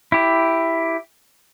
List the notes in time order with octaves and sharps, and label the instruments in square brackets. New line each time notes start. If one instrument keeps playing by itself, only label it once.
[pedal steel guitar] E4 G4